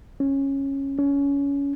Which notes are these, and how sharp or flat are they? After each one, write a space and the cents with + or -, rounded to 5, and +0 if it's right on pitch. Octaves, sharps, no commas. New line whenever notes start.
C#4 -15
C#4 +20